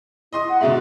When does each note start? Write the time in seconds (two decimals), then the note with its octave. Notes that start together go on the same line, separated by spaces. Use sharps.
0.33 E4 D#5 C6 D#6
0.49 F#5
0.61 G#2 B2 D3 E5